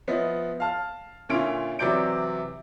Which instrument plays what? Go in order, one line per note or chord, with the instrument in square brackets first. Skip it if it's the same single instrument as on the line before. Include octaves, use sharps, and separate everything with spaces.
[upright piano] F3 B3 E4 D#5
F5 A5 F6
A#2 D3 C#4 E4 F4 D7
C3 E3 F#3 D5 G6 D7